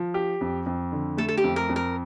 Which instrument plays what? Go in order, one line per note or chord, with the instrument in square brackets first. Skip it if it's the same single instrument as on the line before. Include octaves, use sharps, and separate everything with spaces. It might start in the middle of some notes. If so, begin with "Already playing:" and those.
Already playing: [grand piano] F3
G4
F2
F2
D3
[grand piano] A3 [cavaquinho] A4
[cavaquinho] A4
G4
[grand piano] F2
[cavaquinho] A#4
[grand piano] F2
[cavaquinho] A#4